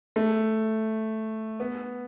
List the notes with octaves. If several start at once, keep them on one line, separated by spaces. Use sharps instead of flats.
A3
B3